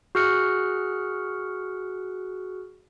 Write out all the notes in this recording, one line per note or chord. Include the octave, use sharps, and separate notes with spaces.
F#4 G#4 F6 F#6 C#7